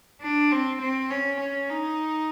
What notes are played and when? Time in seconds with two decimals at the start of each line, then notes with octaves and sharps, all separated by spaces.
0.21 D4
0.51 C4
0.81 C4
1.10 C#4
1.40 C#4
1.69 D#4